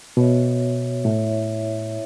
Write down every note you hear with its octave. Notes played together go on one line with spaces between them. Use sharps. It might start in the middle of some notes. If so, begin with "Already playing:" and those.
B2 B3 F#4 C#5 E5
A2 E4 C#5 E5